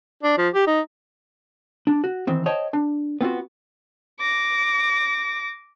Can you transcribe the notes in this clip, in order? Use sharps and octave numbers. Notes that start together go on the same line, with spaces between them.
D4
F3
G4
D#4
D4
F#4
D#3 E3 C4
C5 C#5 D#5 G5 A5
D4
B3 C4 F4 F#4
D6 A#6